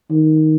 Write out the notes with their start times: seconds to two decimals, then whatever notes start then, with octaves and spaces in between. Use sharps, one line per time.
0.11 D#3